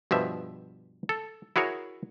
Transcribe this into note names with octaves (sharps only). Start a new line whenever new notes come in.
G2 B2 F3 E5
A4
E4 F#4 G#4 A#4 C#5